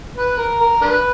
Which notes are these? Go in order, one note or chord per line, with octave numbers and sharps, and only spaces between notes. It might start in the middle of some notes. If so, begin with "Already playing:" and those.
B4
A#4
A#4
D4 B4